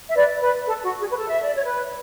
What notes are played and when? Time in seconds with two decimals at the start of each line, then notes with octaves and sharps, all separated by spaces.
0.10 E5
0.16 B4 D5
0.42 B4
0.66 A4
0.83 F#4
0.99 G#4
1.12 B4
1.16 A4
1.30 E5
1.42 D5
1.54 C#5
1.66 B4